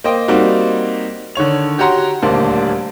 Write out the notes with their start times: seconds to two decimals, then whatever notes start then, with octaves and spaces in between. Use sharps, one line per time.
0.04 A#3 C5 D#5 G5
0.28 G3 A#3 C4 D#4 F#4
1.35 D3 D#3 C#5 F7
1.78 F#4 G4 C#5 F#5 A#5 C6
2.22 D#1 D2 A#3 D4 C5 D5